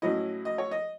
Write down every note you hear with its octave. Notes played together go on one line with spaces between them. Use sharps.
A2 F#3 C#4 E4 D#5
D#5
C#5
D#5